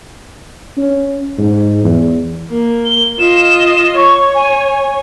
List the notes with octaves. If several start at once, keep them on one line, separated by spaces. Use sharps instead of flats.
C#4
G#2
E2
A#3
G7
F4 D#5 E7
C#5 C#6
G#5